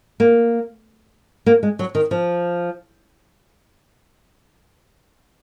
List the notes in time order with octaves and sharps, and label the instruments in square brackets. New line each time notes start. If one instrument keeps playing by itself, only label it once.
[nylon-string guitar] A#3
A#3
G#3
F#3
D#3
F3